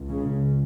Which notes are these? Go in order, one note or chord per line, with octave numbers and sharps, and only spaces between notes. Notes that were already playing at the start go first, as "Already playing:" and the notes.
Already playing: C#2
C#3